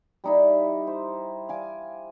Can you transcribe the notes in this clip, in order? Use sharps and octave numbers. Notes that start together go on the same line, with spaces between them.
G3 D#4 E4
C5
F5 G#5 D6